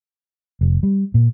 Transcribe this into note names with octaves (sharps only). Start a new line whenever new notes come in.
F1
G3
A#2